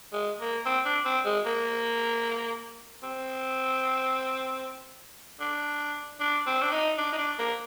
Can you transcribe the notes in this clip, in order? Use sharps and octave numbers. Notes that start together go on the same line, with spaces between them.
G#3
A#3
C4
D4
C4
G#3
A#3
C4
D4
D4
C4
D4
D#4
D4
D#4
D4
A#3